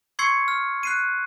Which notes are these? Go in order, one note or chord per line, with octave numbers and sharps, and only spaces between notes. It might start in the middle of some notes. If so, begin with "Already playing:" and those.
C6 C#6 E6 G#6 C7 C#7
F6
F#6 C7 D#7